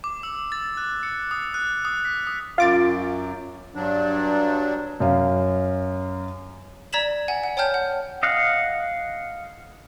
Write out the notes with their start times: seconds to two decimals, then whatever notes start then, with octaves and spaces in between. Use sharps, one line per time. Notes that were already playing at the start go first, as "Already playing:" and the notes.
0.04 D6
0.23 E6
0.52 A6
0.77 F#6
1.03 C#7
1.31 D#6
1.54 F#6
1.85 D#6
2.05 B6
2.27 D#6
2.58 F#2 F4 D6 A6
3.75 G2 F#3 D4
5.00 F#2 F5
6.93 D5 A#5 G#6 B6 E7 F#7
7.28 F#5 G#5
7.43 F#5
7.57 C#5 G5 A5 F6 G6
7.74 F#5
8.23 D#5 F5 F#5